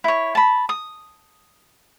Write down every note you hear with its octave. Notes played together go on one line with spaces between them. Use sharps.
E4 C#5
A5 B5
D#6